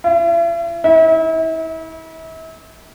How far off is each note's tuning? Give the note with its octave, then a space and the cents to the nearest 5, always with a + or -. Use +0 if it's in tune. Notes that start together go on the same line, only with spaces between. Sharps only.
E4 +45
E4 -35